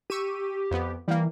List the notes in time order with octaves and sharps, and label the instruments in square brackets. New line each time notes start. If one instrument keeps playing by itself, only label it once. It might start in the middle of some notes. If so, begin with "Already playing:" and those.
[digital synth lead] G4 [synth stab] C#6 E6 D#7
[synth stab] F2 B3
[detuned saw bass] E3 [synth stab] G3 A#3